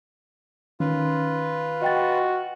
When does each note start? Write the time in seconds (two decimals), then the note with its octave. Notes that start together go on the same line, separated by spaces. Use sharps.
0.80 D#3 C#4 F4 B4
1.82 F#4 D#5 G5 A6